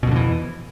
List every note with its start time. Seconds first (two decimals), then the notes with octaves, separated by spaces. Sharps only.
0.03 B2
0.07 F2
0.11 D3
0.16 E3